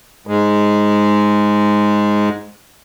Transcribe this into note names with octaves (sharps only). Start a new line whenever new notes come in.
G#2 G#3